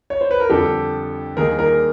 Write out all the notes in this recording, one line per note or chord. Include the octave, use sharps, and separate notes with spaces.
C#5
C5
B4
A#4
F2 D3 G3 G4 A4
D#2 D#3 G3 A#3 G#4 A#4
G#4 A#4